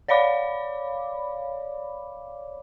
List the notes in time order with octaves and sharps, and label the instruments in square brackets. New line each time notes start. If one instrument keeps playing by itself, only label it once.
[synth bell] C#5 D5 F5 B5 D6